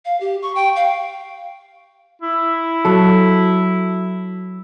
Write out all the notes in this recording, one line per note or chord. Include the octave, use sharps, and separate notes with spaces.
F5
G4
C#6
G5
F5
E4
F#3 A4